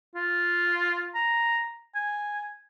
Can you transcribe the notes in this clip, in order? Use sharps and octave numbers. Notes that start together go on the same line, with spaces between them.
F4
A#5
G#5